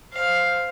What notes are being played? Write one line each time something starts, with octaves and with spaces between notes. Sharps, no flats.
C5 F5